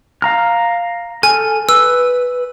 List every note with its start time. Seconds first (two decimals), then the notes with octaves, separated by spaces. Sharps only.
0.22 F5 A#5 F6
1.23 A4 G#5 F6
1.69 B4 E6